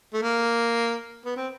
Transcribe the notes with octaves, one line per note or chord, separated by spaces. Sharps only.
A3
A#3
B3
C4